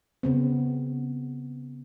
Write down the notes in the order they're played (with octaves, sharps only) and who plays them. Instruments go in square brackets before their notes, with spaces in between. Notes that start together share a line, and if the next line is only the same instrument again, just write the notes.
[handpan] C#3 B3 C4